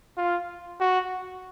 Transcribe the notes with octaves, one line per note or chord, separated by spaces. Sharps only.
F4
F#4